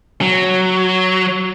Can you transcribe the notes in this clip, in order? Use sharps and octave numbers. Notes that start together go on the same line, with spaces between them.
F#3